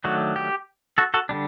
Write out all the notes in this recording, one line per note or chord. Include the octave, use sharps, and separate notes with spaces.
D#3 F#3 A3 D4 F#4
G4
F#4 A4
F#4 A4
D3 G3 D4